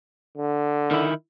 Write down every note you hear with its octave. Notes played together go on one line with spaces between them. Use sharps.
D3
D#3 E4